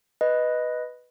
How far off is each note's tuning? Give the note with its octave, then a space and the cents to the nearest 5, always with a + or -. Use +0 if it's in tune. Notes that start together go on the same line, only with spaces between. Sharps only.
B4 +0 D#5 +0